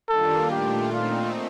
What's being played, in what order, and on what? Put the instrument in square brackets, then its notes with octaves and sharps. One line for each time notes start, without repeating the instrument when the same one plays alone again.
[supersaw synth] D#3 G3 A#3 D4 F4 [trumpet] A4
[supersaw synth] A#2 A3 D4 F4 [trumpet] G4
[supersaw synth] A#2 A3 C4 D#4 [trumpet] F4